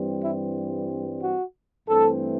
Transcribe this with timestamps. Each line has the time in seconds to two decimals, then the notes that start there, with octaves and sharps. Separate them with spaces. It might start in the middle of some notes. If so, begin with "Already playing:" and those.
Already playing: G2 E3 G3 C4
0.22 E4
1.22 F#4
1.88 G2 E3 A3 C4 A4